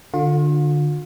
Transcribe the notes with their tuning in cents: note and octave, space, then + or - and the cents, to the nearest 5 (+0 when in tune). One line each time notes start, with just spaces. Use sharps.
D3 +10 F4 +40